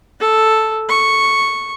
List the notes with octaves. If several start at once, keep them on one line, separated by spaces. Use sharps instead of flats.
A4
C#6